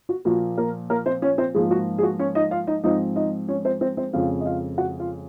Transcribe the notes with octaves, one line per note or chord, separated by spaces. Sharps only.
F#4
A#2 F3 A#3 F#4
A#3 A#4
A#3 A#4
C4 C5
C#4 C#5
C4 C5
G#2 F3 G#3 A#3 G#4
F#4
G#4
F#4
C#4 C#5
D#4 D#5
F4 F5
D#4 D#5
G#2 F3 C4 D#4 D#5
D#4 D#5
C#4 C#5
C4 C5
C4 C5
C4 C5
F2 C#3 G#3 C4 F4 F5
D#5
F4 F5
F#4 F#5
F4 F5